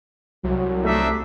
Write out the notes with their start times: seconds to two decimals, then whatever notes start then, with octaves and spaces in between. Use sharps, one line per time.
0.44 C2 F#3
0.85 A3 D4 D#4 E5